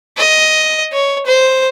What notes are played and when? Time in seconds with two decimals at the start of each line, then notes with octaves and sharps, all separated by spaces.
0.18 D#5
0.93 C#5
1.26 C5